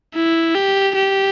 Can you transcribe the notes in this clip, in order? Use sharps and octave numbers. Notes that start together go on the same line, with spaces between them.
E4
G4
G4